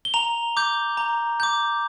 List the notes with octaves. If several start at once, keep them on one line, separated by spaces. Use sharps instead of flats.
G7
A#5 F7
D6 G6
A#5
D6 G6